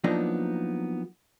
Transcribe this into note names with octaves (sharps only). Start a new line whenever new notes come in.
F3 F#3 A#3 B3 D4 D#4